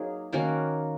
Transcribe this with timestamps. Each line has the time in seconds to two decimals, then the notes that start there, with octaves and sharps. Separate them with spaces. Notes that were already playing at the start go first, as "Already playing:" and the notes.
Already playing: F#3 A#3 D#4 G#4
0.32 D#3 A#3 C#4 F#4